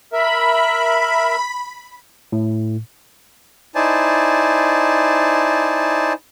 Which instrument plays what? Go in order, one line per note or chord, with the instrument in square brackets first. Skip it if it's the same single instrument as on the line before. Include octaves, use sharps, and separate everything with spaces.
[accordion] A#4 E5 [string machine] B5
[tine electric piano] A2
[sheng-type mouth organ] D#4 E4 C5 D5 G#5 A5